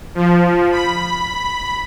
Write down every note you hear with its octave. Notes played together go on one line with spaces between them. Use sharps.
F3
B5